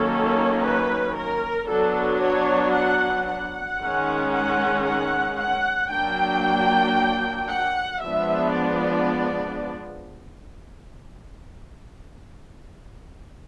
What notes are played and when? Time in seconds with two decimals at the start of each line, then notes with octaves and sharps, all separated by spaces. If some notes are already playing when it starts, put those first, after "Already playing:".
Already playing: D#3 F#3 A#3 C#4 A4
0.63 B4
1.16 A#4
1.69 F#3 B3 D4 A4
2.22 C#5
2.74 F#5
3.28 F#5
3.81 D#3 G#3 C#4
4.33 F#5
4.85 F#5
5.39 F#5
5.92 F#3 A#3 D4 G5
7.51 F#5
8.03 F3 G#3 B3 D4 E5
8.56 D5